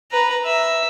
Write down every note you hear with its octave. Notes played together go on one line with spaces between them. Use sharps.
B4 A#5
E5